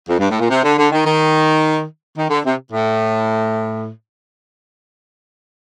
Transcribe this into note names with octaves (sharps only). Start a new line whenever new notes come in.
F2
G2
A2
A#2
C3
D3
D3
D#3
D#3
D#3
D3
C3
A2